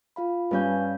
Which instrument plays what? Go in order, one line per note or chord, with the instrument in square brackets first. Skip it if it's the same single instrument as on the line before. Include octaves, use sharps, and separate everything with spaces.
[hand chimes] F4 F5 B5
[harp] G2 C#4 G6 [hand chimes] B4 F5 G#5